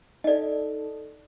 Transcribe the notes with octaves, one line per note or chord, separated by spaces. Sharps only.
D#4 A4 D5 D#5